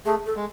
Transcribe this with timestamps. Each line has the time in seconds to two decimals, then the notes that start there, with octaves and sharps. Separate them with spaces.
0.06 A3 G#4
0.26 A4
0.36 G#3